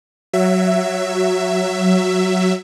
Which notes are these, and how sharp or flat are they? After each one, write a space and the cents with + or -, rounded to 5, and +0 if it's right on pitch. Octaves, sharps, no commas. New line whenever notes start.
F#3 +0 E5 +15